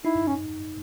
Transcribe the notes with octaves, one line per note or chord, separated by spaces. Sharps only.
D#4 E4
C#4